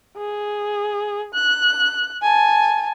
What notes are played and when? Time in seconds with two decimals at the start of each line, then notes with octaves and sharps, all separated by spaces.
0.17 G#4
1.34 F#6
2.22 G#5 A5